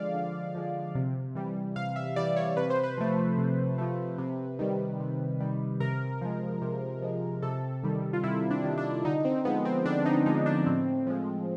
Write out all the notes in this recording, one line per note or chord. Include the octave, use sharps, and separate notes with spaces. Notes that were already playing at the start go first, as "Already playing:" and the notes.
Already playing: D3 F3 G#3 D5 F5
D3
F3 G#3
C3
E3 G3
C3 F5
E5
E3 G3 D5
C#5
C3 B4
C5
B4
F3 A3
C3
F3 A3
C3
D#3 G3
C3
D#3 G3
C3 A#4
F3 G#3
C3
F3 G#3
C3 A4
D#3 G3
F4
C3 E4
D4
D#3 G3
D4
D3 D#4
C4
F3 G#3 B3
C4
D3 D4
D#4
F3 G#3 D#4
D4
A2 C4
F3 G#3